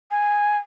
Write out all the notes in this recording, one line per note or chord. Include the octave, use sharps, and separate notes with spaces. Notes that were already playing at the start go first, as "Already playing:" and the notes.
G#5